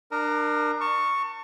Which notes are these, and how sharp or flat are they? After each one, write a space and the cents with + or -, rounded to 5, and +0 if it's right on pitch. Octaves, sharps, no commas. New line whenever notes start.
D4 +30 A#4 +0 E6 -45
A5 +35 C#6 +0